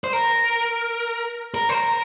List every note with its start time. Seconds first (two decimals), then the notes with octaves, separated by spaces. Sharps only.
0.04 C5
0.13 A#4
1.54 A#4
1.69 C5
1.74 A#4